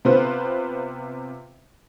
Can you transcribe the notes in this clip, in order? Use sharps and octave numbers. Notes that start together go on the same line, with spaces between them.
C3 B3 C4 F4 B4 C5